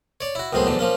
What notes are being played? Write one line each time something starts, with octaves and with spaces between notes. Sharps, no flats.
C#5 D5
E4 F#4
C#2 F#2 A2 B3 C4 G#4
E2 G#2 D3 F#3
F3 A#3 C#4